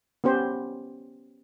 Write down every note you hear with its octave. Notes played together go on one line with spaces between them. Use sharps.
B3 C#4 G4 C5